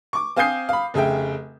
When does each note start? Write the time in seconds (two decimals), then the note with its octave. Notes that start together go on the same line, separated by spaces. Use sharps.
0.13 C#6 D6
0.36 C4 F5 G#5 D#6 G6 C7
0.69 F5 B5
0.94 F1 C#3 G#4 E5 G5